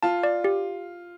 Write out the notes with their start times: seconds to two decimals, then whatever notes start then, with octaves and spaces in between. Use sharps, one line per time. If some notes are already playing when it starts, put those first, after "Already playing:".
0.03 F4 A5
0.23 D5
0.44 G4